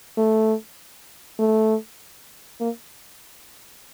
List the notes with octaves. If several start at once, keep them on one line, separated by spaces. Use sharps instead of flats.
A3
A3
A#3